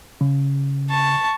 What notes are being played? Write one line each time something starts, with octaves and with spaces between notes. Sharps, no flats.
C#3
A5 C#6